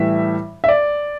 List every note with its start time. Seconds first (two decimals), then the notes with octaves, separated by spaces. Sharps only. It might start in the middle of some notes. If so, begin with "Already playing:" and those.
Already playing: A2 E3 G3 E5
0.64 E5
0.68 D5